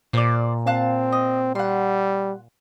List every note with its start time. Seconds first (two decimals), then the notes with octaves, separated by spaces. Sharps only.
0.13 A#2 C5 D5
0.67 C4 F5 A5 F#6
1.12 D#5
1.55 G3 F#5 C6